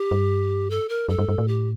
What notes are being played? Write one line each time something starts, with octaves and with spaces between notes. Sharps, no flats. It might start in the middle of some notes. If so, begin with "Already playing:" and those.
Already playing: G4
G2
A4
A#4
F#2 A4
G2
G2
A2
G4